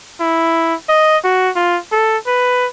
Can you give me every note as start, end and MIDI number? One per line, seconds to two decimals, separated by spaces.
0.21 0.75 64
0.89 1.17 75
1.24 1.50 66
1.56 1.79 65
1.92 2.18 69
2.26 2.67 71